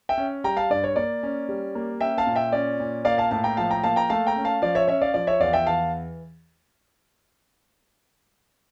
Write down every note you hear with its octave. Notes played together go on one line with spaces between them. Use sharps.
E5 G5
C#4
G3 G5 A#5
F5 A5
G2 D5
C#5
A#3 D5
C#4
G3
A#3
C#4 E5 G5
F5 A5
A#2
E5 G5
C#4 D5
A#2
A#3 D5 F5
F5 A5
A2 F5 A5
G5 A#5
F3 F5 A5
G5 A#5
A#3 F5 A5
G5 A#5
A3 F5 A5
G5 A#5
C#4
F5 A5
F3 D5 F5
C#5 E5
C#4 C#5 E5
D5 F5
F3 D5
C#5 E5
E2 D5 F5
E5 G5
E3 F5 A5